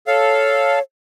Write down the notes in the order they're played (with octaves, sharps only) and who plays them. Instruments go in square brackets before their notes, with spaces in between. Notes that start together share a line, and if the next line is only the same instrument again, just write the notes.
[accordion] A4 F5 [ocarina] C#5